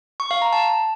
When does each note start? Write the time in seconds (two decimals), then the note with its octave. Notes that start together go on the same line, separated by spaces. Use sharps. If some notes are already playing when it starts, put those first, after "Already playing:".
0.20 C#6
0.31 F5
0.42 A#5
0.53 A5